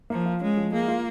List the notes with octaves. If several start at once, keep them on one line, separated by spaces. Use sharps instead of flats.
F3 A#3
F4
G#3 C#4
F3
G#3 A#3
F4